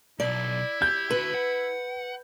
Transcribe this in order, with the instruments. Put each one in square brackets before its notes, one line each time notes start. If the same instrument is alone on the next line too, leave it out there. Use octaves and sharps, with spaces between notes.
[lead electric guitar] B1 [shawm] E4 [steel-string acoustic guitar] D5
[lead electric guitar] G4 [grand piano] G6
[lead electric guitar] D3 F#4 [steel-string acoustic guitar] B4
[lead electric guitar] F#5